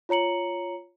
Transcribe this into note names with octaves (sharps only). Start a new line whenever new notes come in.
F4 C#5 A#5 C#7 F#7